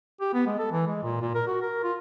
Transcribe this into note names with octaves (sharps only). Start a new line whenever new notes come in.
G4
B3
G#3
A4
E3
G#3
A#2
A#2
A#4
F#4
A#4
F4